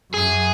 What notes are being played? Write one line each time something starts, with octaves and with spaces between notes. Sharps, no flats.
F#2 G#4